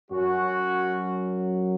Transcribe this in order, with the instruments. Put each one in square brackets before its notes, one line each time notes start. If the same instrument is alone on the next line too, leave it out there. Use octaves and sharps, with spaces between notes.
[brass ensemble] F#2 F#3 C#4 F#4